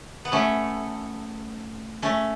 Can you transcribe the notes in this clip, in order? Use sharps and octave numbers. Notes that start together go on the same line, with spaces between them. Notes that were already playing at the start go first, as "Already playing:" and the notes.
B3
A3 C#4
A3 C#4